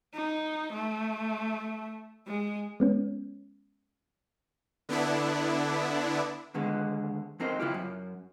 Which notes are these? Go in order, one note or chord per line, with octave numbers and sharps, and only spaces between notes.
D#4
A3
G#3
G#3 B3 C#4
D3 B3 D4 E4
D#2 D3 G#3 B3
F2 C4 D#4 A#4 C5
C#3 E4 F4 G4
F#2